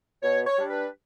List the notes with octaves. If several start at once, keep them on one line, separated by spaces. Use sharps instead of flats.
B2 C#5
C#5
G3 D4
B4